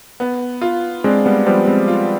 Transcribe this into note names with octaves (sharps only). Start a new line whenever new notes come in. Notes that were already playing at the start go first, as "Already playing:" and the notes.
B3
F4
G#3 C4 D4
G3 B3
F3 G3 B3
G#3 C4
F4